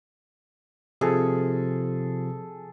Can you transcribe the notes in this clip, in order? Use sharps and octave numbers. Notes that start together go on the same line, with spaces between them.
C3 F3 G#4 A4